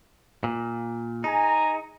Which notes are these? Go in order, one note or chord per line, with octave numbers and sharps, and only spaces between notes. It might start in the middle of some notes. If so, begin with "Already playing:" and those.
A#2
D#4 G#4 G#5 A#5